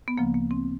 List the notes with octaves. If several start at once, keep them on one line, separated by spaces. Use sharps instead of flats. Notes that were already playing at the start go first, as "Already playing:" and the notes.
B3
D2 C#3 F3 A#3
A#3
C4